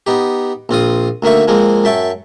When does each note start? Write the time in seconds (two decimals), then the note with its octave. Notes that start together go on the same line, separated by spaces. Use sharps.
0.07 B3 D#4 G4
0.69 A#1 C4 F4 D#6
1.22 D2 D#3 A#3 E5 C#6
1.48 F3 G#3 A#3 C4
1.84 F#2 E5 G5 A5 C#6